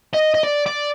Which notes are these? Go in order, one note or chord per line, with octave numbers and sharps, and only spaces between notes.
D#5
D#5
D5
D5